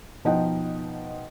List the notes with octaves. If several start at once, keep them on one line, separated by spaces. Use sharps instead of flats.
B2 F3 D#4 D#5 F#5 G5